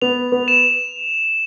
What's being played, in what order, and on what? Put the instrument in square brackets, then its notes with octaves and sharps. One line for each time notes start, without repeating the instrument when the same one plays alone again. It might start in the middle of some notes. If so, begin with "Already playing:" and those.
[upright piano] B3 [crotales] F7
[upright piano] B3
[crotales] E7